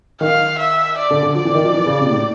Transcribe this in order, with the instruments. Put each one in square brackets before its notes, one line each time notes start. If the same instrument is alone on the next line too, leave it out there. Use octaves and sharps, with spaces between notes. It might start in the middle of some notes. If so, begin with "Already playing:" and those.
[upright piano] D#3 [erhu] F5
[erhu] E5
D5
[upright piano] D3
D3
[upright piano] F3 [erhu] D5
[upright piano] E3
D#3
F3
E3
C#3
C3
A#2
A2